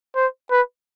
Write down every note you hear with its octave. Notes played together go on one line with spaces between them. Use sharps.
C5
B4